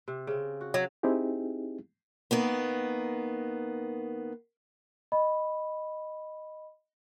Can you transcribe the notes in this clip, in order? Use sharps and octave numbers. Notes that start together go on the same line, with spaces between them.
C3
C#3 C4
F#4
F#3
C4 D#4 E4 G4 G#4
D#3 A#3 B3
D#5 B5